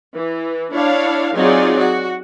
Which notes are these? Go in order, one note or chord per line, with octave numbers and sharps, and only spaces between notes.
E3
D4 E4 C#5 F5
F#3 C4 D#4 F4 G#4 D5
F#4